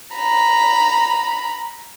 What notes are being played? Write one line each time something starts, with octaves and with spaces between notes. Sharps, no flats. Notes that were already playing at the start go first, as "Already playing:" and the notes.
A#5 B5